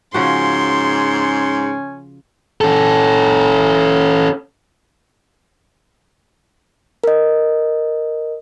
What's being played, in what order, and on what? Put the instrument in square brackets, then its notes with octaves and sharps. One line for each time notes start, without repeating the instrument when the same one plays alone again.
[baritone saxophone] G#2 [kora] C#3 F3 F#4 [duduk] C#4 [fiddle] C6
[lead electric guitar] C#4 A4
[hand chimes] A#4 D#5